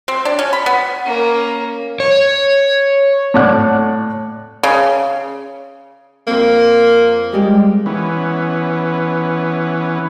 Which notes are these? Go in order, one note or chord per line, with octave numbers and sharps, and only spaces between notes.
C4
D4
C#4
B5
B3
A#3 C#4
C#5
A2 C#5 D5 F#5 F#6
C#3
F2 A#3 C4
G3 G#3 G4
E3 B3 C#4